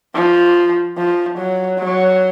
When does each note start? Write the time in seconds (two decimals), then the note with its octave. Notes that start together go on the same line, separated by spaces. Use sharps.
0.15 F3
0.98 F3
1.38 F#3
1.79 F#3